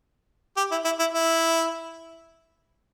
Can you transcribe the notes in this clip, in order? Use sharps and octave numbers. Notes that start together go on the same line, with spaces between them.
G4
E4
E4
E4
E4